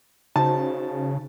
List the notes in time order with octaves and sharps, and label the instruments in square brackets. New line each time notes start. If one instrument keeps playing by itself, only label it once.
[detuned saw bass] C#3 [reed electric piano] D#4 F#4 C5 [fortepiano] A5